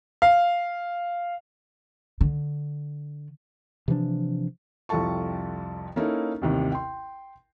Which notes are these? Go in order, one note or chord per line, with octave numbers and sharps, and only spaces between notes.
F5
D3
C3 E3 F3 D4
C2 F2 F4 A4 A5 C#6
A#3 C#4 D#4 E4 A4
A1 D#2 C3
G5 C6